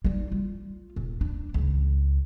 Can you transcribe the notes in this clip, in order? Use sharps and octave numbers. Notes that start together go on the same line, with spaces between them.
G3 D#4
F4
D#1
D4
C#2